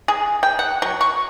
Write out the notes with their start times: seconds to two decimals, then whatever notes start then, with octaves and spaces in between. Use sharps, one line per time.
0.08 G#4
0.43 G5
0.59 F#5
0.82 F#3
1.01 C#6